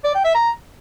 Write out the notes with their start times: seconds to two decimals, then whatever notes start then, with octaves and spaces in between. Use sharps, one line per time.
0.04 D5
0.14 G5
0.24 E5
0.34 A#5